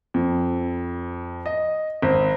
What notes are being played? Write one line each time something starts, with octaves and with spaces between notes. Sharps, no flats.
F2
D#5
G#1